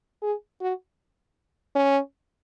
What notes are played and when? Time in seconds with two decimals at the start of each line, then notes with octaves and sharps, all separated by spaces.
0.22 G#4
0.61 F#4
1.75 C#4